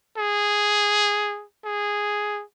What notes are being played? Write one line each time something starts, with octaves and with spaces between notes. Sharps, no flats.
G#4
G#4